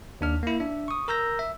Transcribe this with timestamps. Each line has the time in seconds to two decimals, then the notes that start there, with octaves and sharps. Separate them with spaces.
0.21 D#2 D4 F6
0.43 A#3 E4
0.60 D4 E5
0.88 C#6 D#6
1.08 A#4 A#5 E6 G6 A#6
1.39 E5